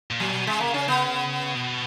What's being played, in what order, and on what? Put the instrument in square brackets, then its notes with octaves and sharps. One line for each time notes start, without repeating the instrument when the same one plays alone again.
[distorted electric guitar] A#2
[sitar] F#3
[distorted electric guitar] B2
[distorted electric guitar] C#3 [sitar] G#3
[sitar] A#3
C#4
B3
[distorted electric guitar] B2